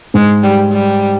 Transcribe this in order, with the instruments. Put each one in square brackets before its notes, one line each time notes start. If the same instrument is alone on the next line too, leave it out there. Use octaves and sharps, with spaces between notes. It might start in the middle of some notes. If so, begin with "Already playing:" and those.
[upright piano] G#2 [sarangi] G#3
[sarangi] G3
G3